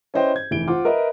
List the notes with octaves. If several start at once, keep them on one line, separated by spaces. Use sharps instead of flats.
C#4 E4 B4 C5 D#5 G5
G6 G#6
F1 E3 D7 G7
F4 C5 F#5 D6
A#4 B4 D#5 E5